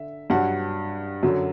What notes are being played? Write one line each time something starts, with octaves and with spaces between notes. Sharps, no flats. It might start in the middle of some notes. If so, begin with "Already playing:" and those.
Already playing: D3 E5
G2 F#3 F#5
F#2 D3 F#3